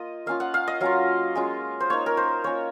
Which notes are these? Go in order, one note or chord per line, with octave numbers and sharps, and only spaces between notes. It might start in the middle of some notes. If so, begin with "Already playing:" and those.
Already playing: A#3 F4 D#5
A#3 C#4 F4 F5
F#5
F5
D#5
F#3 C#4 F4 F5
G#3 C#4 F4
C5
A#3 D#4 C#5
A#4
C5
A#3 C#4 F4 C#5